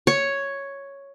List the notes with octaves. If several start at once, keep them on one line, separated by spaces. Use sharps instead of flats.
C#5